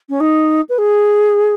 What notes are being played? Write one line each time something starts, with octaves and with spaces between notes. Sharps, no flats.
C#4
D#4
B4
G#4